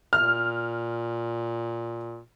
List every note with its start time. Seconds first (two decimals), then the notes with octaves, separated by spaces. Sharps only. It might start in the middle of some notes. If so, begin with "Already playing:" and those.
0.13 A#2 F6